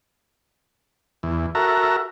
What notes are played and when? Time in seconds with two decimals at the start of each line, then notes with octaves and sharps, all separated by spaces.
1.23 E2
1.55 F#4 A4 A#4 E5 A#5